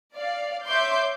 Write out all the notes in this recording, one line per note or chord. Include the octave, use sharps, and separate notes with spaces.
D5 F5
C#5 E5 C6 D6 G6